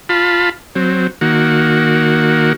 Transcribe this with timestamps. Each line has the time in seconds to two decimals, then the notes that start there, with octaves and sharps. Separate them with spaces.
0.09 F4 A5 B5
0.75 F#3 C4
1.21 D#3 A#3 F#4